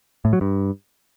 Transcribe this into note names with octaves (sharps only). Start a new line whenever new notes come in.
A2
F#3
G2